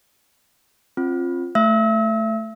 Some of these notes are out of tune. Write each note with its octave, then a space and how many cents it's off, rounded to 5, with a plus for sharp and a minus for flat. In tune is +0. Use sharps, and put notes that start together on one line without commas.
C4 +30 F4 +0
A3 +0 E5 +30 E6 -35